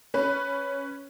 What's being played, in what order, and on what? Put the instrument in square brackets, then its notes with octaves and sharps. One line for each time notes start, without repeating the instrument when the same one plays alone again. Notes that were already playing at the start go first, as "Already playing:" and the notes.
[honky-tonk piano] C#4 B4